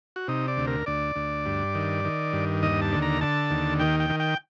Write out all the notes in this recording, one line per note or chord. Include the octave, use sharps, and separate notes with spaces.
F#4
C3 D#4
D5
D2
A#4
D2 D5
D2
G2
D#3
D#3
G2
D#2 D#5
A5
D3
A#5
D3 A5
D#2
D#3 G5
G5
D#3
G5